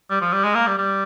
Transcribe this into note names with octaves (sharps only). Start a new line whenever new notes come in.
G3
F3
G3
G#3
A#3
G3
G3